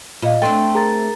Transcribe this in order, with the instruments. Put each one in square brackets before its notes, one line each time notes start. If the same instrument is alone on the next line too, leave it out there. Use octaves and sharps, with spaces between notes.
[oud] A#2 [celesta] F4 D#5 F5
[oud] A3 C4 D4 [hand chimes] G5 C6 [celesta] A6
[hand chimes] G#4 A#4 A6 [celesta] A#5